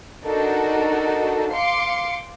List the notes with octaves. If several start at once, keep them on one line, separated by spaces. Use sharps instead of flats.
D4 D#4 F#4 A4 A#4
F5 C6 D6 C7 C#7